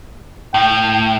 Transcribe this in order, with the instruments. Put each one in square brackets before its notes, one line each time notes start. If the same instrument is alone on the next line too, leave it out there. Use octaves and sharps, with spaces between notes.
[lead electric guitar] A2 [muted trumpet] G5